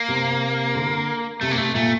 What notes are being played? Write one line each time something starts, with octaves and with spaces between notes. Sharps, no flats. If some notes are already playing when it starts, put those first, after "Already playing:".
Already playing: A#3
C3
D3
C3 A3
A#3
C3 A3
A#2 A3